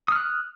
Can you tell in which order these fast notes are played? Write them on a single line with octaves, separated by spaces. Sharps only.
D#6 F6 F#6